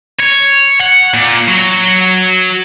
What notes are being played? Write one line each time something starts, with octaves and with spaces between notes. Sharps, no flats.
C#5
F#5
A#2
F#3